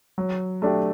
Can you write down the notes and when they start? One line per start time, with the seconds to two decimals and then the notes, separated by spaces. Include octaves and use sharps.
0.18 F#3
0.62 A3 D4 G4